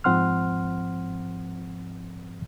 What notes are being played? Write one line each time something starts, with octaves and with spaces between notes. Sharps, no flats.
G#2 F3 C4 F#5 C6 F6